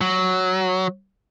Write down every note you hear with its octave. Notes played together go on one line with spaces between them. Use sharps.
F#3